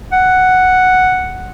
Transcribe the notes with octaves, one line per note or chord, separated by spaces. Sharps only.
F#5